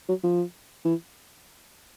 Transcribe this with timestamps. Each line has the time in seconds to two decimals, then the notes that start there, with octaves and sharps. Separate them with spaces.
0.09 F#3
0.24 F3
0.85 E3